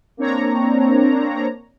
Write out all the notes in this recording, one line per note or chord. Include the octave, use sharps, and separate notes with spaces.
A#3 C4 D4 C#5 A#5